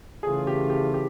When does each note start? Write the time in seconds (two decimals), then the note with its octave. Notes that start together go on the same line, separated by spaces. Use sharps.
0.23 C#3 E3 A3 C#4 F4 G#4
0.47 G4
0.70 G4
0.94 G4